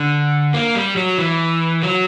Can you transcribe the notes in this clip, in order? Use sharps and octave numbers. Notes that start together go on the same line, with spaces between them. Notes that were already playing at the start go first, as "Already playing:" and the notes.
Already playing: D3
A#3
G3
F#3
E3
F#3